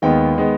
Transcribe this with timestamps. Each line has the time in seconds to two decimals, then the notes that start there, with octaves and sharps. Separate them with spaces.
0.02 D#2 D#3 G#3 B3 G5
0.36 D#3 G#3 B3